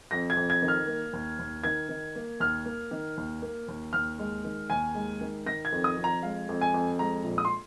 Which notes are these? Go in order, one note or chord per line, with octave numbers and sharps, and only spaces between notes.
F2 A#6
G#6
F2
G#6
D#3
F6
A#3
D#2
D#2
D#3 G#6
D#3
A#3
D#2 F6
A#3
D#3
D#2
A#3
D#2
D#2 F6
G#3
D#3
D#2 G#5
G#3
D#3
D#3 A#6
G#6
F2
D#6
F2
A#5
G#3 F5
F2
G#5
F2
G#3 A#5
A#1
D#6
C6